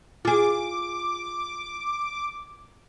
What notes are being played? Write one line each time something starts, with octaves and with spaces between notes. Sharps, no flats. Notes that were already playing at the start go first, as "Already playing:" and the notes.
F4 G#4 D6